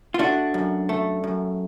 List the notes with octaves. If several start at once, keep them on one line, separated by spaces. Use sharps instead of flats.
F4
A3 D4 F#4
F#2
A3
F#2